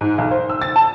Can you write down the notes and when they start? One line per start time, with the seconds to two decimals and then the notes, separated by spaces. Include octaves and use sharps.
0.01 G#2
0.18 B1
0.31 C5
0.50 E6
0.62 A6
0.76 A5